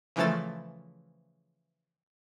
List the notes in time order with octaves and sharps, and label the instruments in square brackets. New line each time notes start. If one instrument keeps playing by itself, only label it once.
[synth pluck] C#3 E3 F3 A3 A4 A6